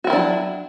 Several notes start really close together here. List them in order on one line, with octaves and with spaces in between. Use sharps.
F#4 E4 D#3 D4 F#3